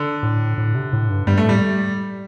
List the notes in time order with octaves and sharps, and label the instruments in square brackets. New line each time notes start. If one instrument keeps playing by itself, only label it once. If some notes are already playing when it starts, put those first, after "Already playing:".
Already playing: [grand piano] D3
[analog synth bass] A2
A2
C3
A2
G2
[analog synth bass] G2 [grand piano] G3
[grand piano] A3
[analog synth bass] A2 [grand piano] G3